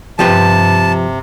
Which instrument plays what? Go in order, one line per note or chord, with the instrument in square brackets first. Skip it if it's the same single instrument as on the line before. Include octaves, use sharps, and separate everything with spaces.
[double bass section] G2 [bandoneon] C3 [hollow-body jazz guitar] F3 G4 B4 [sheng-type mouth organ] A5